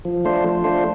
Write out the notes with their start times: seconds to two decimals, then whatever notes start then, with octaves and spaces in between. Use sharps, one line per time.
0.05 F3
0.25 A3 D4 F4 C5
0.44 F3
0.64 A3 D4 F4 C5